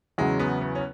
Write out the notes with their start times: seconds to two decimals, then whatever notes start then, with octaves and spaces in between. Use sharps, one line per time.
0.18 E2 C#3 F#3 G#3
0.39 B3
0.61 B3
0.75 C#4